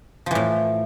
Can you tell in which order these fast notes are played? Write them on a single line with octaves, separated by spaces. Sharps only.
F3 E3 A2